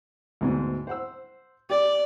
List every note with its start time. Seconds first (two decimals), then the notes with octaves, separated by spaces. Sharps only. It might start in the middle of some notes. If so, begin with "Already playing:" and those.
0.41 D2 G#2 B2
0.87 C5 F#5 E6
1.70 G4 D5